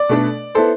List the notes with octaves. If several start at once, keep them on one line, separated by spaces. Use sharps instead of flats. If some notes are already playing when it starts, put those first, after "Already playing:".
Already playing: D5
B2 A3 D4 A4
B3 E4 A4 C5